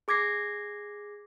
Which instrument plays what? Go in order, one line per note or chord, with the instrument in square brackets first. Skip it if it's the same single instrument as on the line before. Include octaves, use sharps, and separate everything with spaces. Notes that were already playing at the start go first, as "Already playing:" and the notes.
[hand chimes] G#4 D6 G#6 A#6 C7